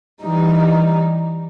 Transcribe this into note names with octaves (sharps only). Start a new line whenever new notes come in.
E3 G3 D#4